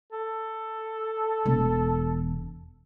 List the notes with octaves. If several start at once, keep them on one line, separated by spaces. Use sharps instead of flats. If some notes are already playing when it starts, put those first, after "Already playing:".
A4
E1 E2